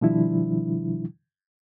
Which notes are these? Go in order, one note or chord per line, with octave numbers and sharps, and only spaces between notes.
B2 D#3 F3 G3 D4 E4